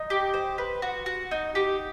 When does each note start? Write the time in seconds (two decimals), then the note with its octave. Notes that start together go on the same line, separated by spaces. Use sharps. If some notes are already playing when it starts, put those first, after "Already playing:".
Already playing: D#4
0.10 G4
0.34 C5
0.58 B4
0.82 F#4
1.06 F#4
1.31 D#4
1.55 G4